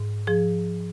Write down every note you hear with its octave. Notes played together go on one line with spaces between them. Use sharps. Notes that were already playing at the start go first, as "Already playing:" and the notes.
Already playing: G#2
F3 G#4